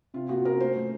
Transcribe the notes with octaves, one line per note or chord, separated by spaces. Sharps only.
C3 F4
A#3 F#4
C#4 A#4
A3 C5
A3